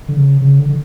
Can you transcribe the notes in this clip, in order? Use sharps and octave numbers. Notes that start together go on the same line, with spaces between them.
D3
C#3
C#3
D3
D3